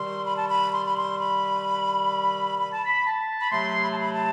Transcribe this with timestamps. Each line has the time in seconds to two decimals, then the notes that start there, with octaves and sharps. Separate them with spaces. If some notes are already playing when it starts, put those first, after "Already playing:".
Already playing: C3 D#3 G3 C6
0.26 B5
0.37 A5
0.48 B5
0.73 C6
0.85 B5
0.97 C6
1.19 B5
2.58 B5
2.72 A5
2.86 B5
3.06 A5
3.41 B5
3.51 C3 F#3 A3 C6
3.83 B5
3.91 A5
3.99 B5
4.14 A5